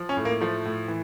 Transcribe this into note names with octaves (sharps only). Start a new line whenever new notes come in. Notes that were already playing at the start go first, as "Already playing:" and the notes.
Already playing: F3
C#4
A2
A#3
F3 A3
A2
E3